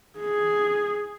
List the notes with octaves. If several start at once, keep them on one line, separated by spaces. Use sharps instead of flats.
G#4